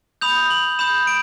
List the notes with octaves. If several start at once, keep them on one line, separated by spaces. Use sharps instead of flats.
B5 D#6 G6 F7
F#7
B5 D#6 G6 E7
D7